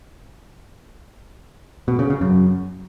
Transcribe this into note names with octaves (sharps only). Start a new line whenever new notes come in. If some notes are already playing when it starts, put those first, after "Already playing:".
B2
C#3
C#3
F#2